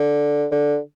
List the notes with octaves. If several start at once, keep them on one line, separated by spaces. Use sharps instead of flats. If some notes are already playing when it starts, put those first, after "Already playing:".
Already playing: D3
D3